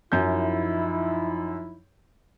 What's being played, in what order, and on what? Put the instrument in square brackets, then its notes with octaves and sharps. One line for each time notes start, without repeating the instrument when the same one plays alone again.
[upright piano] F#2 G6 [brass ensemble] F3 D#4 E4